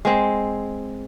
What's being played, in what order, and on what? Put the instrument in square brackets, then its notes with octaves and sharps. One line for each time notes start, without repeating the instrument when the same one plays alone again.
[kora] G#3 C4